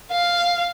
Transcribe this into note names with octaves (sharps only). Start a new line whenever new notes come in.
F5